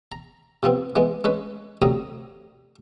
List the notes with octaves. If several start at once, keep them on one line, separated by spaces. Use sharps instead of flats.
A#5
C3 F3 B3 C4
E3 G#3 B3
G#3 C#4 B4
D2 C3 F#3 A#5 D#6